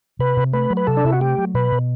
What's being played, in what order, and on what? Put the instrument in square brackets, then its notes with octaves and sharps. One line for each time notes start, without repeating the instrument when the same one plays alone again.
[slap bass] C3 [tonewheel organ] B4
[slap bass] C3
[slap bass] A3 [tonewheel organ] B4
[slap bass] F#3
[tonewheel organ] B4
[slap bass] C3 [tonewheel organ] A4
[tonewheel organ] D4
[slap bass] C3 [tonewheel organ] E4
[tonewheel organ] F#4
[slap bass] A3 [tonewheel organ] G4
[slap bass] F#3
[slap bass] B2 [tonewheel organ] B4
[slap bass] B2